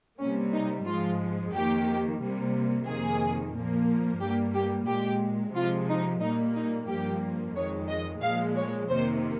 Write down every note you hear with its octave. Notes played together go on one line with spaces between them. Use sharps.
C3 G3 A#3 C#4
D#4
G#2 F3 G#3 F4
F2 D#3 A#3 G4
C3 G3 A#3
F2 C3 D#3 A#3 G#4
A#2 F3 A#3
G2 G3 A#3 G4
G4
A#2 G#3 G4
C3 F3 G#3 F4
D#4
A#2 G3 A#3 D#4
D#4
G2 F3 A#3 G4
F2 D#3 G#3 C#5
D#5
A#2 F3 G#3 F5
C#5
F2 C3 D#3 A#3 C5